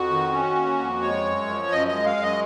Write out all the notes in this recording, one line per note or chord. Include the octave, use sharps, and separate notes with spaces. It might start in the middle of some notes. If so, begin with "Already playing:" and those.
Already playing: F2 F#4
D#3
C#4
A#3
F2
G#3 C#5
F#2
F3
F#2 D#5
D#5
G#3
F5
F#2
D#5